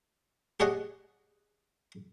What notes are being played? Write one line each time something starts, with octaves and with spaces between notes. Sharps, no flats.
G4 G#4 C#5 D#5 F#5 G#5